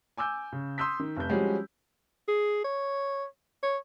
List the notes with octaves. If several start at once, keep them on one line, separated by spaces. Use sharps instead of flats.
G#5 D6 E6 G6
C#3
C6 D#6 E6 G6 B6
D#3
F1 G6
F3 G3 G#3 C#4 F#4 G4
G#4
C#5
C#5